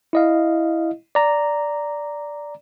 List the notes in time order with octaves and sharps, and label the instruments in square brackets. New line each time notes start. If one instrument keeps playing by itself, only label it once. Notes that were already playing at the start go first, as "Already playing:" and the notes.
[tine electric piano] E4 D#5 F5
D5 A#5